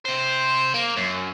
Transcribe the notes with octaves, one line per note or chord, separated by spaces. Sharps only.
C3 C5
A#3
F#2